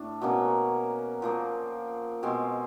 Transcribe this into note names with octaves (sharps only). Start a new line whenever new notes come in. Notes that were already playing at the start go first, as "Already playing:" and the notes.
Already playing: A2 D4
B2 F#3 A#3 C#4
A#2 F3 A#3
B2 G#3 C4